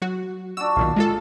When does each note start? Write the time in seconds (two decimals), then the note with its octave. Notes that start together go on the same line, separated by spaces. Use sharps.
0.02 F#3 F#4
0.57 D4 F#4 E6
0.77 B1 A#2 D#3 F5
0.96 G#3 F4 A4